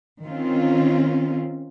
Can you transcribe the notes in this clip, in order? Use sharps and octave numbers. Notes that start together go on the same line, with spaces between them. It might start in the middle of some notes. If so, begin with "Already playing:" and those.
D#3 C4 C#4 F4